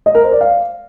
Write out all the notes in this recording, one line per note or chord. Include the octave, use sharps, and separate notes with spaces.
D#5
A#4
C5
D5
F5